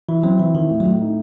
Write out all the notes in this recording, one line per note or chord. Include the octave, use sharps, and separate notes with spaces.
E3 E4
F#3 C4
E3 E4
D#3 E4
A2
F#3
A2
D#4